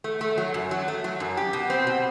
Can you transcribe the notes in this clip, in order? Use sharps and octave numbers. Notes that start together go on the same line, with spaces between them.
A3
A3
F#3
F#2
F#3
A3
F#3
F#2
G4
B2
C4
B2